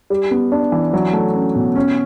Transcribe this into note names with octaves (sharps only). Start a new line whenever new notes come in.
G3
B3
D4
E3
F#3
A3
C#4
B2
C#4